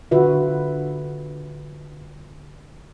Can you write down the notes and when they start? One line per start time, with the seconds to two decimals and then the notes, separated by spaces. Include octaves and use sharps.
0.11 D3 F4 F#4 B4 E5